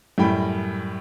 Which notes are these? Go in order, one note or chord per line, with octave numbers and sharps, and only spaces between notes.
F#2 A2 G3 G5 B5